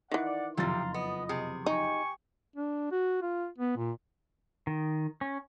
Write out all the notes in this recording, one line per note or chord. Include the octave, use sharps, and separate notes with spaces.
D#3 E3 D5 F#5
F#1 F2 C3 G3 F5 A#5 C6 A6
B3 D#5
C3 G#4
D#4 G4 G#5 C#6
D4
F#4
F4
B3
A#2
D#3
C#4